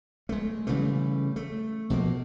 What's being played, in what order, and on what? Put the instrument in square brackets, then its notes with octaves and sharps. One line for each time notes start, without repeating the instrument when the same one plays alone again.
[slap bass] G#3 A3
C#3 E3 G3 A3
A3
B2 F3 A#3